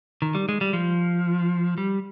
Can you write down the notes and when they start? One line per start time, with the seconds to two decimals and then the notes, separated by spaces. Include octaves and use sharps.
0.22 D#3
0.35 G3
0.49 G#3
0.61 G3
0.73 F3
1.78 G3